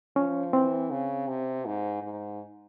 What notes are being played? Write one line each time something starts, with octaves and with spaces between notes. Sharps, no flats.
F3 C#4
E3 C4
C#3
C3
G#2
G#2